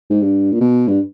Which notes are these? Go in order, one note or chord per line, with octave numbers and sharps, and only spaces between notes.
G#2
G2
A#2
B2
G2